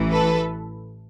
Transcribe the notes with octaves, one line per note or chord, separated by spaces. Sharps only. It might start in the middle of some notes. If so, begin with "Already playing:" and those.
Already playing: A1 A2 E3
A4 B4